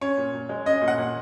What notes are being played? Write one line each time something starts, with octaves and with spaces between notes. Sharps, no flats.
C#4 C#5
A#2
A#2
G#3
C#4 D#5
A#2
F#5
A#2